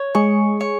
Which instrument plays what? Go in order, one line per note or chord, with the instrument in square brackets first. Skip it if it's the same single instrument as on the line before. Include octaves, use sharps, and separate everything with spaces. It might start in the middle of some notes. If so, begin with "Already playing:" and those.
Already playing: [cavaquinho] C#5
[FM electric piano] G#3 G#4 [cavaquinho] C#6
[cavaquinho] C#5